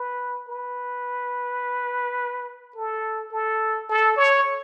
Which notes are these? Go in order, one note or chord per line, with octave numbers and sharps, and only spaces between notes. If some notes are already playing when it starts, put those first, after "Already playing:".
Already playing: B4
B4
A4
A4
A4
C#5